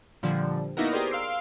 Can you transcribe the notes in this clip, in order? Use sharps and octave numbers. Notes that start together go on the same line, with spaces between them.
A#2 D3 F3 G3
A#3 B3 D#4 E4 F#4 A#4
G4 G#4 A#4 C5 D5 D#6
F5 C6 E6 C7 D7